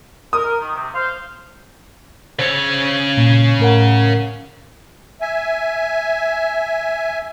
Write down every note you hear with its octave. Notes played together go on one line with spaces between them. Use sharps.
A#4 D#6
D#3
C3
C5 F5
C#3 C5 C#5 E6 A6
A#2
A2 A#4 F#5
E5 G#5